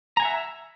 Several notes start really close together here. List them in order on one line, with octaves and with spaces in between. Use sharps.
A#5 G#5 F#5 E5